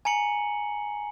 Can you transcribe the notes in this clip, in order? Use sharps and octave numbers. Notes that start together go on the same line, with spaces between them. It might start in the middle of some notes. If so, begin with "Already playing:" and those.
G#5 A#5 C#7 F#7